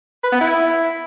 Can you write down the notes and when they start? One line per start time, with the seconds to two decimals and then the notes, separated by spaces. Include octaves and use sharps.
0.24 B4
0.32 B3
0.41 E4